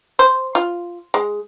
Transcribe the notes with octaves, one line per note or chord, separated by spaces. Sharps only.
C5
F4
G#3